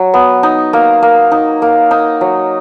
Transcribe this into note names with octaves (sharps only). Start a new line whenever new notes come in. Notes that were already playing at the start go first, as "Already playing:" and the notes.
Already playing: F#3
B3
D#4
A#3
A#3
D#4
A#3
D#4
F#3